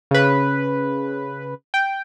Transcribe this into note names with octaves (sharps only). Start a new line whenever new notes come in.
C#3 B4
G5